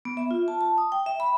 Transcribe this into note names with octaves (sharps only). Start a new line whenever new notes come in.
B3
E5
F4
A5
A5
D#6
G5
E5
B5